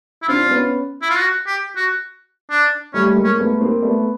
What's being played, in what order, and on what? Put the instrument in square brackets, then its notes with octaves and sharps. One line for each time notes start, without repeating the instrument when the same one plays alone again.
[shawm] E4
[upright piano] C4 D4 [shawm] F4
[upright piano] C4
B3 C#4
[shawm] E4
F4
F#4
G4
F#4
D4
[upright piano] G3 A3 [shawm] C#4
[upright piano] A3
G#3 A#3
[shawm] C#4
[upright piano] A#3
A3 B3
A#3 C4
A3 B3